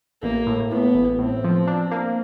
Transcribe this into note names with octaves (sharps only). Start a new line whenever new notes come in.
A1 A#3
A2
A2 B3
A1
A2 C4
F3
D4
A#3